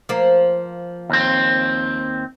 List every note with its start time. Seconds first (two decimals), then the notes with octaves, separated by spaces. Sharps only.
0.09 F3 A#3
1.10 D#2 C4